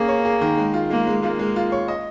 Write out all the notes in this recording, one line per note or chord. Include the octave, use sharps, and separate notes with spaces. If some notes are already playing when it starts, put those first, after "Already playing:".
Already playing: A#3 C#4 G#4
C#5
G#4
D#3
G#3
F4
G#3 A#3
G#3
A#3 F4
G#3
F4
C#5
D#5